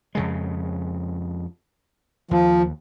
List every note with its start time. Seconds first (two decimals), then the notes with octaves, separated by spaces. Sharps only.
0.15 F2 C#3 G#3
2.31 D#2 F3